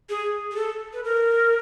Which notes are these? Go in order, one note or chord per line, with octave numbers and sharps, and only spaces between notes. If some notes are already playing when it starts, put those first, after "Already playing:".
G#4
G#4
A4
B4
A#4